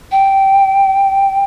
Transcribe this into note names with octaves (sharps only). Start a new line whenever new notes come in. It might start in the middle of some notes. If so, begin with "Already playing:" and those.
G5